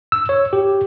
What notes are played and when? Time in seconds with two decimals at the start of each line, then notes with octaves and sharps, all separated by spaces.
0.12 E6
0.29 C#5
0.53 G4